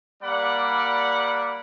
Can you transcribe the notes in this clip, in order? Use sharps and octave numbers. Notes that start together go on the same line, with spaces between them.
G3 A#3 D5 F#5 B5